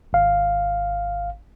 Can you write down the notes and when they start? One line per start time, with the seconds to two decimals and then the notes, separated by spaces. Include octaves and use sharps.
0.13 G#1 F5